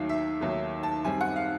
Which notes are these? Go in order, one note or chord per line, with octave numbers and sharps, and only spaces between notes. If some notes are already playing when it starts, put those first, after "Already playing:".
Already playing: D#2 D#3 F#3 A3 F5
E5
D#2 D#3 F#3 A3
A5
F#2 D#3 G3 C4 G#5
F#5
F5